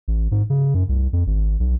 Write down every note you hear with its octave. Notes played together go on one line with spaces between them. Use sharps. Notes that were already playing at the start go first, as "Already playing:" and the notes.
A1
G#2
C#3
F#2
C2
F2
G#1
B1